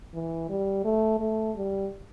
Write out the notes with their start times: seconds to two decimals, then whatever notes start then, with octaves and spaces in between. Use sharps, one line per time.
0.14 E3
0.49 G3
0.84 A3
1.20 A3
1.56 G3